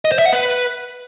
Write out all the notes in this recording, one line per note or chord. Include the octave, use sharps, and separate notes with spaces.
D#5
C5
E5
F#5
B4